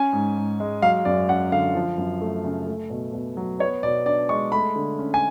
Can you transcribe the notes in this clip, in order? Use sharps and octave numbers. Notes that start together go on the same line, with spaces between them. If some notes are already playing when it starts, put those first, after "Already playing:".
Already playing: C#4 G#5
G#2
G#2
G#3
F#3 F5
F#2 D5
C#4 F#5
D3 F5
F3
F#2
A3
C#3
A3
B2
B2
F#3
B3 C#5
B2 D5
D4 D5
G#3 C#6
A3 B5
D3
C#4
G#5